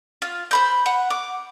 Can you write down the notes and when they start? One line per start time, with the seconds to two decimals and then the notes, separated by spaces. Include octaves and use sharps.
0.22 F4
0.51 C5 B5 G6
0.86 F#5
1.10 D6